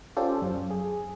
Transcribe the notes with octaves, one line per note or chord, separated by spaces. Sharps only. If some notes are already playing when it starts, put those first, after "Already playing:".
C#4 F4 G4 A4 C5 D5
F#2
G#4